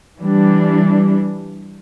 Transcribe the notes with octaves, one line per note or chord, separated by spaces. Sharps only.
E3 G3 D4